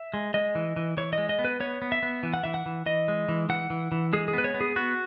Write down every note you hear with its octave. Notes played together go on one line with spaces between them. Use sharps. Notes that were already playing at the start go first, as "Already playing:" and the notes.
Already playing: E5
G#3
G#3 D#5
E3
E3
E3 C#5
G#3 D#5
D#5
B3
B4
B3 C#5
B3
E5
B3
E3
F#5
E3 E5
F#5
E3
E3 D#5
G#3
E3
E3 F#5
E3
E3
G#3 G#4
G#4
B3 B4
C#5
B3
G#4
B3 F#4